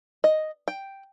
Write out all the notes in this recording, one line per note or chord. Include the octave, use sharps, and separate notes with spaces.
D#5
G5